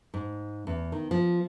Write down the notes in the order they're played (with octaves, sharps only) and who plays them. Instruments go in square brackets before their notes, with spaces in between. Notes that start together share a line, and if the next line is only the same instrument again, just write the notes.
[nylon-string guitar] G#2
E2
D#3
F3